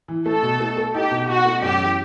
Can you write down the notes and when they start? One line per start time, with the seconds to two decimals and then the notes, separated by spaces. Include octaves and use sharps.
0.08 E3
0.26 A3 A4
0.43 B2
0.60 A3
0.77 A4
0.94 D#4 G4
1.11 B2
1.29 B2 F#4
1.45 A3
1.62 F#2 G4
1.79 E3